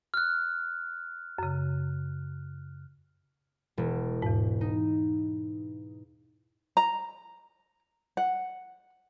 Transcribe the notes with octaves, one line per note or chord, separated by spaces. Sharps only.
F6 F#6
F#2 C#3
E1
E2 G#2
D#4
A#5
F#5